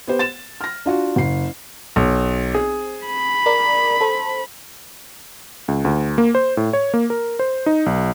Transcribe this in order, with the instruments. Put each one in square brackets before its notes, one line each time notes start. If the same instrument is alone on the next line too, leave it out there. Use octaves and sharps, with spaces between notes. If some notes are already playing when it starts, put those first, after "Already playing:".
[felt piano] B3 G4 C5
A6 E7
F6 A#6
D4 F4 F#4
F#1 C7
[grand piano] B1
[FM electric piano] C4 [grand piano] G#4
[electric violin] B5
[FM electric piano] A#4 D5
A4 C5
[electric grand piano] C#2
D2
A#3
C5
A2
C#5
A#3
A#4
C5
D#4
B1